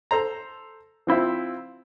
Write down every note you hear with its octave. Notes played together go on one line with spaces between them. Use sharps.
A4 C5 A#5
F3 C4 E4 F4